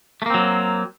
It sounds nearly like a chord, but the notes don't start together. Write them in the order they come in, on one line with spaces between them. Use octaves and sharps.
A3 A#3 C4 F#3